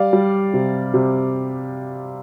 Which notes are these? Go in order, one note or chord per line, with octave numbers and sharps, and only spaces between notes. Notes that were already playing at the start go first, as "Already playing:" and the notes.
Already playing: G3 D5 F5
G3
C3
C3